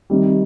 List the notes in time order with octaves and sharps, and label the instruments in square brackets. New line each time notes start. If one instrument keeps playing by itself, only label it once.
[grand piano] C3 D#3 G3